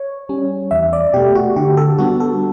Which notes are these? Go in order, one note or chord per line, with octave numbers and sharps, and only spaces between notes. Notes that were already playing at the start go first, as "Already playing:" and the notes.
Already playing: C#5
G3 C#4
E2 E5
D5
B2 A3 G4
F#4
D3 G4
A4
G3 B3 D4 F#4
A4